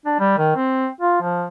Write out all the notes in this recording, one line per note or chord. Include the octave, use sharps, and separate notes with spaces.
D4
G3
D#3
C4
F4
F3